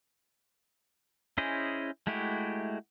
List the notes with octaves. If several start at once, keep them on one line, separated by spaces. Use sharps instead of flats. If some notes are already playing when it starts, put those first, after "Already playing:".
C#4 E4 G#4 C5 D#5
G#3 A3 E4 F#4 G4